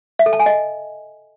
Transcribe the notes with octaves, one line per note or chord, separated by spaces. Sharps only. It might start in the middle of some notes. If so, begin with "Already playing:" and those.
E5
A4
A5
G#5
D#5